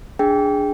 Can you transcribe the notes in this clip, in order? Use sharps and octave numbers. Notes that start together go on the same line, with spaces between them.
D4 G#4 G5